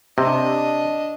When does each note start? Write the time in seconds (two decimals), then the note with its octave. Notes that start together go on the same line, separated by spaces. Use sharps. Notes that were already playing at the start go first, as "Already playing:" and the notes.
0.18 C3 D4 D#5